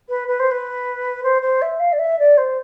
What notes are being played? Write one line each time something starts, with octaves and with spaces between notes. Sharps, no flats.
B4
B4
C5
B4
C5
C5
E5
F5
D5
E5
D5
C5